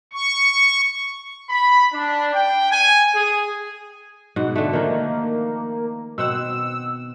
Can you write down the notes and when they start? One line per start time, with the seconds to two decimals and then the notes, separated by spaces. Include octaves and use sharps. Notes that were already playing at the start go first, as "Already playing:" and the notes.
0.13 C#6
1.50 B5
1.93 D4
2.34 G5
2.71 G#5
3.14 G#4
4.36 G#2 B2 F#5
4.56 D3 A3
4.73 D#3 F3 A#3
6.18 B2 C4 F#5 E6